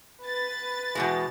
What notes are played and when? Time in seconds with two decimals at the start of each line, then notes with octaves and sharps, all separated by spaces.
0.22 B4 A6
0.95 E2 B2 G#3